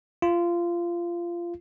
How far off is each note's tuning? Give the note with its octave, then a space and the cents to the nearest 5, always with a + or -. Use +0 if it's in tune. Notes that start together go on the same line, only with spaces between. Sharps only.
F4 -20